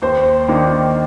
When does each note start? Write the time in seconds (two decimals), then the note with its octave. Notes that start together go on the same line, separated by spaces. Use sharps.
0.02 D#2 C5
0.48 D#3 A#3 D4